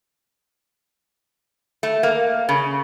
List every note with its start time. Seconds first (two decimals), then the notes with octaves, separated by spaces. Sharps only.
1.83 A3
2.03 A#3
2.49 C#3